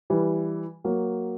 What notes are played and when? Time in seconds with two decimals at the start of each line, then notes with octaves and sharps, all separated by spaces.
0.10 E3 G3
0.84 F#3 A#3